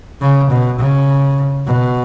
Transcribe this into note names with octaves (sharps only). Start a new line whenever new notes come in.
C#3
B2
C#3
B2